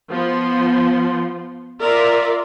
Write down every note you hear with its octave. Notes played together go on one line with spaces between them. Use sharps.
F3 B3 C6
F4 A#4 D5 E5